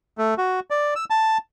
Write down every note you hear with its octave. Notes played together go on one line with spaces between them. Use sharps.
A3
F#4
D5
E6
A5